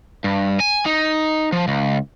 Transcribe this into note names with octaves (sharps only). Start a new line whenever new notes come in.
G2
G#5
D#4
F3
C#2